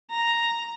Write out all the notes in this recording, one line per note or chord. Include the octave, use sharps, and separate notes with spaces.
A#5